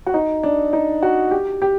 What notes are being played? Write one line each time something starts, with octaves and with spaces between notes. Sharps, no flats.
F#4
D#4
D4
D#4
F#4
G4
G4